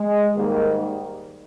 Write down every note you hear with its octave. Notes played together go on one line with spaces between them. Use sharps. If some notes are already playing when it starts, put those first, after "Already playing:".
Already playing: G#3
G#2 D#3 G3 A#3